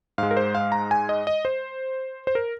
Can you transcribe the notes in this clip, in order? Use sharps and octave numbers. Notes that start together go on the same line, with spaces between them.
G#2 G#3 F5
A#4
C5
F5
A#5
G#5
D#5
D#5
C5
C5
A#4